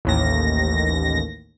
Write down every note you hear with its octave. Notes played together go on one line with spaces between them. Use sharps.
A1 D#2 A#6